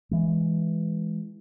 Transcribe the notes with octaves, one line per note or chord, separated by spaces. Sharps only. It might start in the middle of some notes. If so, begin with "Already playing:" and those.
E3 G#3